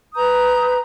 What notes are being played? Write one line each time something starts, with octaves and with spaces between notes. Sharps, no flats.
B4 A#5 D#6 G6